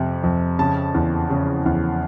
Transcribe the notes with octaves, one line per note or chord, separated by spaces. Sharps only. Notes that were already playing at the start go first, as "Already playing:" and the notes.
Already playing: F2 C3
F2
C#3 A5
E2
C#3
E2